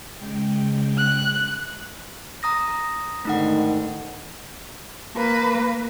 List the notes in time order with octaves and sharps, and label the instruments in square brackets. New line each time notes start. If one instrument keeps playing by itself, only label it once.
[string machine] C#3 G#3 G5
[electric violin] F#6
[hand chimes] A#5 D#6 A#6
[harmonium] G#2 D3 D#3 [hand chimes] A3 D#4 F#5
[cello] A#3 B4